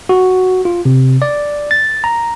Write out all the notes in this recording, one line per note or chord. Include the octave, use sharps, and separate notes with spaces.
F#4
F4
C3
D5
A6
A#5